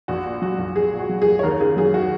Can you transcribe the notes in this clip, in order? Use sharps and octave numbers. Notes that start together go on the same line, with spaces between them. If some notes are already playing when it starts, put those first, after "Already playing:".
A#1 F#4
A#2
F#3 F#4
A#1
A#1 G#4
A#2
F#4
F#3
G#4
A#1
C#5
D#2 A#4
C#3 G#4
F#3 G#4
F#4